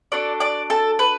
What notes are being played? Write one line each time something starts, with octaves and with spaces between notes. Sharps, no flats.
D4 F#4 A4 D5 D6
D5 D6
A4 A5
B4